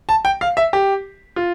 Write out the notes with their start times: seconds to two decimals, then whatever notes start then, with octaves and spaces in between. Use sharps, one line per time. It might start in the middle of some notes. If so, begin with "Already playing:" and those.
0.09 A5
0.25 G5
0.41 F5
0.57 E5
0.73 G4
1.36 F4